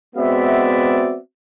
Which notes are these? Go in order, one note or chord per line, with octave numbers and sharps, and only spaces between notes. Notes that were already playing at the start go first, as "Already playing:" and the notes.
G#3 B3 C4 F#4 D5 E5